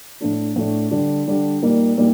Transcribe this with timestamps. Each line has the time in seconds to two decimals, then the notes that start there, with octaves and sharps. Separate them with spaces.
0.21 A2 A3 D4
0.56 A2 A3 D4
0.91 D3 G3 D4
1.27 D3 G3 D4
1.62 A#2 G3 A#3 D#4
1.98 A#2 G3 A#3 D#4